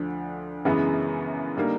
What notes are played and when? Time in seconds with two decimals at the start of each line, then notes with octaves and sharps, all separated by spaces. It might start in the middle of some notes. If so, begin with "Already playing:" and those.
Already playing: D2 D3 F3
0.65 F#2 C#3 E3 G#3 B3
1.57 D3 G3 A#3 D#4